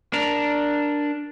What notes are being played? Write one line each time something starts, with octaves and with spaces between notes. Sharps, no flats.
D4 A#4